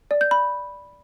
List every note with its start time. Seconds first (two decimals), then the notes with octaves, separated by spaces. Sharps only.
0.11 D5
0.21 G6
0.31 B5